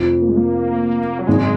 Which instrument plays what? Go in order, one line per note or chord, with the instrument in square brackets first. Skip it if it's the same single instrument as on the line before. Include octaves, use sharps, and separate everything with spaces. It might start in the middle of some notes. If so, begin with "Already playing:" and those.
Already playing: [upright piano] F1 F2 F3
[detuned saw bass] A#3
G#3
A#3
F#3
[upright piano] G#1 F#2 C#3 [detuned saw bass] G#3